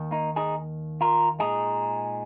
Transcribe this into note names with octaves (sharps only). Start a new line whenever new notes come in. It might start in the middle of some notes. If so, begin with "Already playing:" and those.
Already playing: D#2 D#3
A#3 D#4
D#4 G#4
F4 A#4
A#2 G#3 D#4 G#4